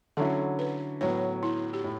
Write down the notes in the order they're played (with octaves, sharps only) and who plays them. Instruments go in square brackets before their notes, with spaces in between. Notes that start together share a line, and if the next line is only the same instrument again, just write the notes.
[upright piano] D3 F#3 C#4 E4 [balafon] A4
[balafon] B4
[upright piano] A2 F#3 B3 [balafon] C#5
[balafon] E4
G4
[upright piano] A2